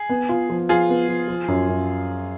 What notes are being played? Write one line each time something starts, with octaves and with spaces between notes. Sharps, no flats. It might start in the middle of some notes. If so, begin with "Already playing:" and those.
Already playing: G#4
B3
F4
F3
F3 F4 G#4
B3
F3
F3
F#2
F#2